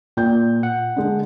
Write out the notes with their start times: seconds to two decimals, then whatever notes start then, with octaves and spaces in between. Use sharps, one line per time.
0.17 A#2 G5 G6
0.63 F#5
0.97 D3 G#3